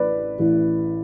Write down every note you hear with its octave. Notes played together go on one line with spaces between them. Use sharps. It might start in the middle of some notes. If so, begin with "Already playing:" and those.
Already playing: A1 A2 E3 B4 D5
A1 A2 E3